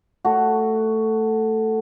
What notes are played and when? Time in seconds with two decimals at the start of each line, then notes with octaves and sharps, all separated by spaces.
0.25 A3 F#4